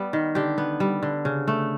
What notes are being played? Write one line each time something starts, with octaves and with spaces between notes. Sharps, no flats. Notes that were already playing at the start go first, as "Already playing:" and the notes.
Already playing: G3 B3
D#3
D3 G4
B3
G3
D3
C#3
A3